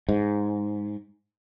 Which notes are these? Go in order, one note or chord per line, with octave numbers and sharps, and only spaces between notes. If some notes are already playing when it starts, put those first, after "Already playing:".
G#2